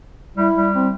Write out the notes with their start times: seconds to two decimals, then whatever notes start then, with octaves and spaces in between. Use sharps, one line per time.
0.37 G3 E4
0.55 G3
0.74 C4